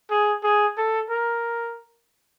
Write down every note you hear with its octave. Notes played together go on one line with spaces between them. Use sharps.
G#4
G#4
A4
A#4